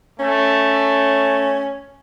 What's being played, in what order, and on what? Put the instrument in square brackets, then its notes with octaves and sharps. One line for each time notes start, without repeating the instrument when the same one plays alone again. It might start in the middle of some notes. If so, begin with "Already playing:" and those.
[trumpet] A3 [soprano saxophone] C#4